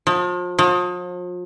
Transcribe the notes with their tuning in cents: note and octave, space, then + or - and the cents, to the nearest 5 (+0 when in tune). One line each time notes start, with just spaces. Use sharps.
F3 +35
F3 +40